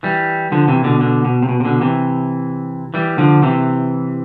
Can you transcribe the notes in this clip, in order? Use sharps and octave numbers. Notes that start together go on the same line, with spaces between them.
E3 G3
D3 F3
C3 E3
B2 D3
B2 D3
B2
C3
B2
C3
B2 D3
C3 E3
E3 G3
D3 F3
C3 E3